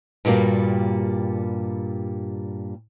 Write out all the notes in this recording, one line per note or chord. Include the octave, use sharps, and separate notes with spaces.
G2 A#2 G3 A#3 F#4